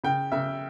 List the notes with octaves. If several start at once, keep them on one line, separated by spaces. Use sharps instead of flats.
C#3 G5
C#3 E5